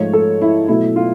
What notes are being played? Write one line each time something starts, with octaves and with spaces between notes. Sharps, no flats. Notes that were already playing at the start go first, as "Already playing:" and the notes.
Already playing: G#2 F3 A3 C#5
A4
E4
B2 F#3 A3 E4
F4